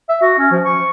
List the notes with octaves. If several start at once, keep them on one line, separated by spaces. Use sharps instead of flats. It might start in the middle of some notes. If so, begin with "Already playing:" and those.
E5
F#4
C#4
F3
C#6